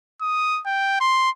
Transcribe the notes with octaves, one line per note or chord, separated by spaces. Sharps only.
D#6
G5
C6